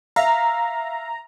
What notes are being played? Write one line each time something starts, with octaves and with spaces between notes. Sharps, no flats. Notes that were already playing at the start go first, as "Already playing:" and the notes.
E5 F5 A#5